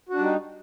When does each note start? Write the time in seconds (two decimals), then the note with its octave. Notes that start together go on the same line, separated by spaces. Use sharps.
0.09 F#4
0.13 D4
0.18 G3
0.22 D#4